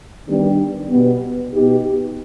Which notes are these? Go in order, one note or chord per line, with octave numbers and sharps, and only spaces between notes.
D#3 G3 B3 D4 G4
B2 G3 B3
B2 B3 D#4 G4